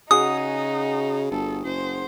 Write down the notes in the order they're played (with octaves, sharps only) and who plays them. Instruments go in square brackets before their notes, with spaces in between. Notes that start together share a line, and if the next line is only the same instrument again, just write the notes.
[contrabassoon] C#3 [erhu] D#4 [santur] F#4 G#4 [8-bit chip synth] D#6
[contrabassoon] G1 [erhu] A4
[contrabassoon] F#1 [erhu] C5